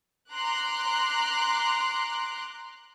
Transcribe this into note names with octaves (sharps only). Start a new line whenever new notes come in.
A#5 C6 D6 F#6